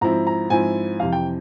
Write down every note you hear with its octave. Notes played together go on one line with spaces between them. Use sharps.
G#2 F3 C4 E4 A#5
A#5
G#2 F3 C4 E4 G#5
F2 C3 E3 F5
G5